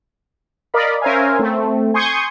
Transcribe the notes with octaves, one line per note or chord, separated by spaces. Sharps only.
A#4 D5 D#5 F5 B5
C#4 A#4 C5 E5 F5 G#5
A3 C4
G#5 C6 C#6 D#6 G6 G#6